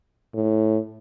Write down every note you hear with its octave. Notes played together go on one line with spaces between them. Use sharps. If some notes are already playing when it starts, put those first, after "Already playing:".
A2